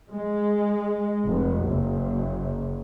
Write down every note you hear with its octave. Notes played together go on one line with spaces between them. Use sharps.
G#3
F1
F#1